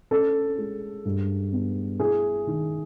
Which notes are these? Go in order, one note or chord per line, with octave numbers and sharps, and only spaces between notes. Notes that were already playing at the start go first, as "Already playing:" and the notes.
C#4 A4
G#3
G2
B3
E4 G#4
D#3